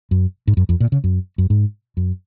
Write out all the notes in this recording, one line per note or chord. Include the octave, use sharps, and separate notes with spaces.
F#2
G#2
F#2
F2
A#2
C#3
F#2
F#2
G#2
F#2